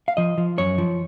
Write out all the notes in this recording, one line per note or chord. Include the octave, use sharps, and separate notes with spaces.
F5
F3 D#5
F3
F#2 C#5
F3